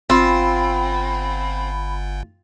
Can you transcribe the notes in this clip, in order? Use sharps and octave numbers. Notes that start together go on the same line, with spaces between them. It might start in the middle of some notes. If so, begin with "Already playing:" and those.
G1 C4 F4 B5